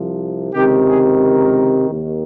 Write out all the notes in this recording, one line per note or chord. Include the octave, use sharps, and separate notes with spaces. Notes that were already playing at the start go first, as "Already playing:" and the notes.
Already playing: C2 C3 F3
C#2 C3 D#3 G4
G#4
A#4
D#2 D#3